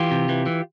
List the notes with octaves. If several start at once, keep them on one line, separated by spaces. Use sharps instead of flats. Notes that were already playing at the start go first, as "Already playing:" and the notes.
Already playing: E3 F4 G4
C3
E3
E3